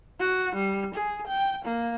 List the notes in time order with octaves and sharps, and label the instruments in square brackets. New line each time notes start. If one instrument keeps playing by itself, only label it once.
[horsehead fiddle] F#4
G3
G#4
G5
A#3